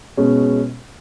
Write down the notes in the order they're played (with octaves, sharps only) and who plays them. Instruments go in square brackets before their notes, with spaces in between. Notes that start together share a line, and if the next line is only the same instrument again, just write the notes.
[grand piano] B2 G#3 C#4